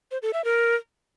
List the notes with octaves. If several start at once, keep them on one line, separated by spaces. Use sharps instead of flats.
C5
A4
E5
A#4